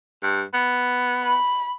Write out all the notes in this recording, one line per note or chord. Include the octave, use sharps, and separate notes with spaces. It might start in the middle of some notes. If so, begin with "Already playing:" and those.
G2
B3
B5